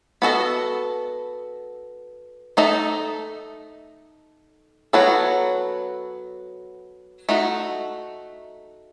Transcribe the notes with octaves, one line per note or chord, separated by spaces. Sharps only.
B3 F#4 A4 D#5
A3 D#4 A4 D#5
F#3 B3 F#4 A4
A3 D#4 F#4